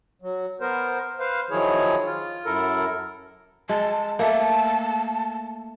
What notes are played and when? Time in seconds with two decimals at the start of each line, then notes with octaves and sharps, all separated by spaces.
0.22 F#3
0.61 B3 A#4 C5
1.20 B4 C5 F5
1.50 D#3 F3 F#3 E4 G#4 C#5
2.05 F4
2.45 F#2 E4 A4 A#4
3.69 G#3 A5
4.19 A3 A#3 A5